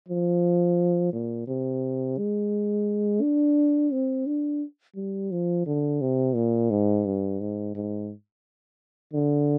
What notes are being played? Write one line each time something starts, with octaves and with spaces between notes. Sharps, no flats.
F3
A#2
C3
G#3
D4
C4
D4
G3
F3
D3
C3
A#2
G#2
G2
G#2
G#2
D3